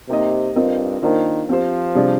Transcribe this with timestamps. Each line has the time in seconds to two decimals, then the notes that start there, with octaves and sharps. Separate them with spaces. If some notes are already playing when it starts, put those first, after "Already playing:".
0.09 C3 A#3 D#4 G4 C5 D#5
0.56 G2 C4 F4 A#4 D#5
1.02 D#3 A#3 D4 F4 C5
1.49 F3 C4 G4 C5
1.95 C3 G3 D4 G#4 D5